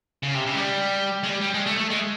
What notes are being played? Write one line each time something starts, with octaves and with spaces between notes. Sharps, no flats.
C#3
C3
C#3
G#3
G3
G#3
G3
G3
G#3
A3
A3
G#3